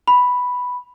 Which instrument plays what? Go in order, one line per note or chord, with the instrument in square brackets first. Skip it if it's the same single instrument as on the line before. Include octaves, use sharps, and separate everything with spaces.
[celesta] B5